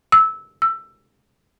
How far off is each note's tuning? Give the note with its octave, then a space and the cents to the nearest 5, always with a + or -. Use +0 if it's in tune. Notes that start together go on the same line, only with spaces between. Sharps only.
E6 -15
E6 +15